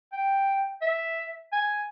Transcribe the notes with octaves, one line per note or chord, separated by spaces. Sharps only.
G5
E5
G#5